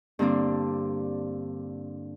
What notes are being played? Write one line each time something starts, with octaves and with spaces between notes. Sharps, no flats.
G2 D3 A#3 C4 D4